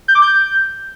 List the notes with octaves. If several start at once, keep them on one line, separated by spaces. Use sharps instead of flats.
G6
D6
G6